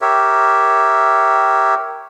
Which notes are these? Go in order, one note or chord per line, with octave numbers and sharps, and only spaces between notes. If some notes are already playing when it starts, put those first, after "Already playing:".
G4 A#4 C#5 E5